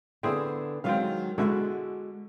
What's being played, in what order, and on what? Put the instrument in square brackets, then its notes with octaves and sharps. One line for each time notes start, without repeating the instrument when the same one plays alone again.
[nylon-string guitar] D3 B3 [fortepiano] C4 E4 G#4
[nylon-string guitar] D#3 F#3 G#3 [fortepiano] C4 F4 F5
[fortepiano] B2 D3 E4 [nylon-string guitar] G#3 F#4